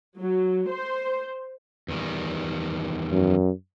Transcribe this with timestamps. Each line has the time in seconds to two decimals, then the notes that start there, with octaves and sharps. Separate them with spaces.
0.19 F#3
0.71 C5
1.88 E2 D#3 G3
3.12 F#2